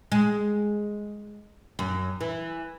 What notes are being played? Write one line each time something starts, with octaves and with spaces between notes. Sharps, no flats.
G#3
F#2
E3